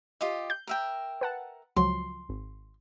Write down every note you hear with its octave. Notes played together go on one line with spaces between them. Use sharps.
F4 G4 D#5
G6
A#4 E5 G5
B4 F#5 A5
C#2 F3 F#3 C6
G#1